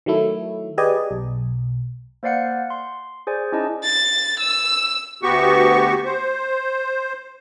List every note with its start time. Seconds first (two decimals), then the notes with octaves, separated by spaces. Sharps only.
0.06 D#3 F#3 A3 E4
0.78 G4 G#4 B4 D5 D#5 G#5
1.11 B1
2.23 A#3 C5 D5 F5 F#5 C#7
2.70 C6
3.27 G#4 C5 D5 G#5
3.52 C#4 D#4 E4 G#4 D#5 A5
3.84 A6
4.40 E6
5.23 D2 B3 F#4 G4 C#6
6.05 C5